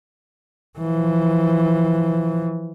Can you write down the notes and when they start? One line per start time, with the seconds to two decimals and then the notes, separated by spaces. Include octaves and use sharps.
0.78 E3 F3